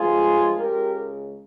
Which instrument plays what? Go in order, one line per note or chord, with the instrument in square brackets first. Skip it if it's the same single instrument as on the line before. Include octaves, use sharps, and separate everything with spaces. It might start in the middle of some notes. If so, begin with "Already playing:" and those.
Already playing: [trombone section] G2 F3 G#3 F4 G#4
C#2 C#3 G#3 G4 A#4